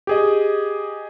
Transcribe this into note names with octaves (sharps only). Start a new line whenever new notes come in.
G4 G#4 D#5